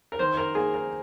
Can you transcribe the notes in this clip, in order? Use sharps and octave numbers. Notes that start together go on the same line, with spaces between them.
A#4
D#3 C5
A#4
A#3 G#4
A#4